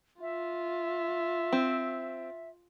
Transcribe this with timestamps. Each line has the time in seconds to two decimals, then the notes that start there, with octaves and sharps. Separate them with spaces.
0.21 F4 E5
1.52 C4